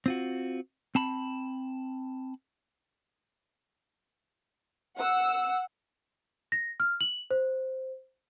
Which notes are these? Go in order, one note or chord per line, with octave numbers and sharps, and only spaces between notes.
C4 F4 F#4
C4 A5 B5
F#5 E6
A#6
F6
F#7
C5